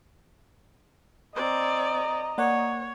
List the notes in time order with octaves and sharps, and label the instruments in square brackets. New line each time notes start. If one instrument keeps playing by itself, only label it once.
[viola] C4 D5 [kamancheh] D#5 A#5
[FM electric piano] A#3 D5 F#5 [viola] C#5